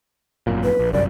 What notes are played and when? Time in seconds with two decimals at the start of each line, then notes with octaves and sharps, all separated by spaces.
0.47 G#1 F#2 A#2
0.64 B4
0.79 A#1
0.93 G1 C2 F#2 D5